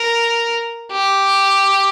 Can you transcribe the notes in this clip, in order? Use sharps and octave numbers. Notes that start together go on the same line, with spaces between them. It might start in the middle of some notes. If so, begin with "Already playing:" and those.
Already playing: A#4
G4